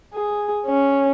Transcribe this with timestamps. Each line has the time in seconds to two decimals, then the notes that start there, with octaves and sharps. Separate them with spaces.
0.14 G#4
0.66 C#4